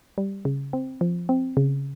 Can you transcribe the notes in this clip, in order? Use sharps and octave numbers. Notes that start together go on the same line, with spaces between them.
G3
C#3
C4
F3
C4
C#3